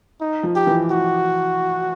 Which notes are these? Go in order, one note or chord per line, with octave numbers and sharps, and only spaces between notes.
D#4
F3
G4
E3
F#4